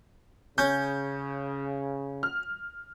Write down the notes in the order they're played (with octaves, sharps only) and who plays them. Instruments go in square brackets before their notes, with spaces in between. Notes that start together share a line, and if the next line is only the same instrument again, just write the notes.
[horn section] C#3 [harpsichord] C#4 [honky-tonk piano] G6
[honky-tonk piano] F6